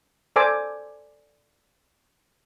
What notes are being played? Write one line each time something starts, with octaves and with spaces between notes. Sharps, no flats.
A4 C5 D5 G#5 D6 E6